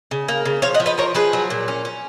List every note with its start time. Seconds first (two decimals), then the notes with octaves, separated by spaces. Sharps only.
0.11 C#3
0.28 A#3
0.45 C#3
0.62 F3 C#5 F5
0.74 D#5 F#5
0.80 F3
0.86 B4 D#5
0.98 F3 A#4 C#5
1.15 F3 G#4 B4
1.33 F#3
1.50 A#2
1.68 C#4
1.85 C#4